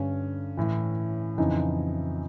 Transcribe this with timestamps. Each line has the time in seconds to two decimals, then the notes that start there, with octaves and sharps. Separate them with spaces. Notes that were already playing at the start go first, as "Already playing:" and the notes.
Already playing: G2 D3 C#4
0.57 A2 E3
1.38 F2 C#3 E3 D#4